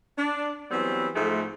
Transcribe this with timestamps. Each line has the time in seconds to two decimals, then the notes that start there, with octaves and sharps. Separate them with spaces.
0.17 D4
0.71 E3 F#3 G3 B3 C4
1.14 G#2 F3 G#3 A3